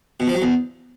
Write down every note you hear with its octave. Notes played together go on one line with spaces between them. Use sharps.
B2
F3
F#3
E2